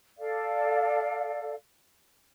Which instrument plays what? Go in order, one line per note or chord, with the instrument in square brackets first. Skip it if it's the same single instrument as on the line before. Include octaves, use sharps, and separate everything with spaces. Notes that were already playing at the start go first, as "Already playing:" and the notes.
[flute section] A4 D5 F5